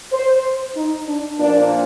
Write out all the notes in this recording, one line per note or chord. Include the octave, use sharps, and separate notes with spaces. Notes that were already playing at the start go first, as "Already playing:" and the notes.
C5
D#4
D4
A#2 F3 A#3 D4